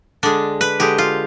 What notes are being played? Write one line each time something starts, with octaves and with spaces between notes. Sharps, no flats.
D3 G#3 D4
B4
D3 G#3 G4
F4